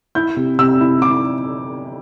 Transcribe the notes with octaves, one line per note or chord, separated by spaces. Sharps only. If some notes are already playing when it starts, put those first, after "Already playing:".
E4 G6
C3
C3 E6
E4
E4 D6